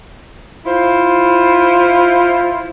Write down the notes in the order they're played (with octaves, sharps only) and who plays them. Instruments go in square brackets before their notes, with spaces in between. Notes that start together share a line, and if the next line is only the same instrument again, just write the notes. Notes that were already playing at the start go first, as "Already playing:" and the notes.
[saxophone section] E4 F4 C5